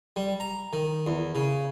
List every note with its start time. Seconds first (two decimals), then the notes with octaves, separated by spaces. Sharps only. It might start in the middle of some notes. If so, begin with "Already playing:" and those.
0.16 G3
0.40 A#5
0.73 D#3
1.07 E2
1.35 C#3